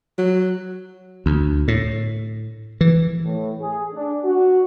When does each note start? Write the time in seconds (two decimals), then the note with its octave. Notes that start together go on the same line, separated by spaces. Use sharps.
0.18 F#3
1.26 D2
1.68 A2
2.81 E3
3.25 A2
3.60 G#4
3.94 D4
4.25 F#4